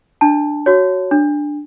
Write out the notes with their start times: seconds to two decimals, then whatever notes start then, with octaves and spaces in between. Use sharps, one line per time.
0.21 D4 A5
0.66 F#4 C#5
1.11 D4